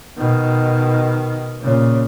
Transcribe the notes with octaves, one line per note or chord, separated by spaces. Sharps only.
B2 D#3
A#2 C#3